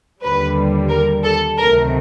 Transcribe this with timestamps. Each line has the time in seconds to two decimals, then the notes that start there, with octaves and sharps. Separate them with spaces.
0.22 D#2 D3 G3 B4
0.89 A#4
1.24 A4
1.57 C#2 C3 D#3 F#3 A3 A#4